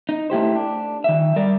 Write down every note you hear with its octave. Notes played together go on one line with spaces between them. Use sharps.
D#4
A3 E4 G4 C5
D4
D#3 E5
G3 A#4 D5